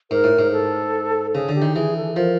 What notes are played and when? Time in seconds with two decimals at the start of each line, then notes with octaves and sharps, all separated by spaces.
0.11 G#2 A#4
0.24 A2
0.39 G#2
0.52 A4
1.34 C#3 G#4
1.49 D3
1.55 G4
1.62 D#3
1.76 E3 G#4
1.97 A4
2.16 F3 A#4